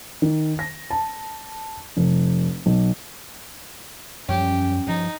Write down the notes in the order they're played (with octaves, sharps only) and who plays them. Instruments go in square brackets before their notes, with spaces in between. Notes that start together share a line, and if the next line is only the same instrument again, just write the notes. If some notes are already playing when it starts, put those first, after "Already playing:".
[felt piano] D#3
A#6
A5
F1
B1
[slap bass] F#2 F3 G3 [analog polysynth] C#4 [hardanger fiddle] G4
[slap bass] G2 F3 [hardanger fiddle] D#4